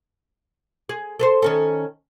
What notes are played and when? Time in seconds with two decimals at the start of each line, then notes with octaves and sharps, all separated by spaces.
0.89 G#4
1.20 A4 B4 C5
1.42 D#3 C#4 A4